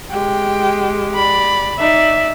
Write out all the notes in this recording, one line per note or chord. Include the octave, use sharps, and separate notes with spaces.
G#3 G4 G5
D5 B5
D#4 D5 E5